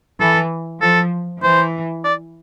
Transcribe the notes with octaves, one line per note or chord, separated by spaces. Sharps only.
E3 A4
F3 A4
E3 C5
D5